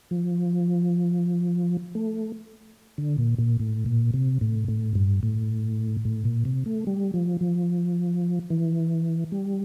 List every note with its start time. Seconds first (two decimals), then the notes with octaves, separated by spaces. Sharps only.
0.11 F3
1.95 A3
2.98 D3
3.18 A#2
3.38 A#2
3.60 A2
3.86 A#2
4.14 C3
4.41 A2
4.68 A2
4.95 G2
5.23 A2
6.05 A2
6.25 A#2
6.45 C3
6.66 A3
6.87 G3
7.14 F3
7.41 F3
8.50 E3
9.32 G3